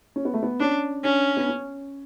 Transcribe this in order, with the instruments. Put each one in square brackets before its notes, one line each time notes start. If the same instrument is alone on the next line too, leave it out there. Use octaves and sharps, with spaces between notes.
[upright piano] C#4
B3
A3
B3
[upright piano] C#4 [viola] D4
[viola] C#4 [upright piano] D4
[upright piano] B3
C#4